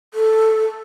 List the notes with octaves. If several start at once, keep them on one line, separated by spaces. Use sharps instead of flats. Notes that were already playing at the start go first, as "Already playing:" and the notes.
A4